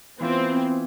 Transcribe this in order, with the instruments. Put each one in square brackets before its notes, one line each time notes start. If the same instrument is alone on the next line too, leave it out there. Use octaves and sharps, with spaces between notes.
[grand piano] E3 B3 F4 [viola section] C4